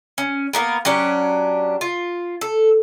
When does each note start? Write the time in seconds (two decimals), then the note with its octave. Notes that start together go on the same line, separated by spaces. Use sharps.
0.18 C#4
0.53 A#3 B3 A#4
0.85 F#3 C#4 D4 G4
1.81 F4
2.41 A4